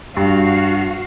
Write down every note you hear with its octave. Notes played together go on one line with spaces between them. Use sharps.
G2 F#4 F5